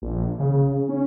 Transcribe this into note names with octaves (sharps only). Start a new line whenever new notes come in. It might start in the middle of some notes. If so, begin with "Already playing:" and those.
A#1
C#3
C#4